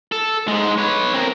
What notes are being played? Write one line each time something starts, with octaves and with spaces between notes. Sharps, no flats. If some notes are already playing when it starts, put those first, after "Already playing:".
A4
G#2 G#3
B4 C#5
C4 A#4